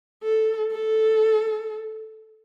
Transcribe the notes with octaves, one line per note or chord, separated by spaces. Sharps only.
A4
A4